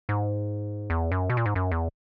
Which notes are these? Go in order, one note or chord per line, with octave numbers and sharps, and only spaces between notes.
G#2
E2
F#2
B2
A#2
G#2
F#2
E2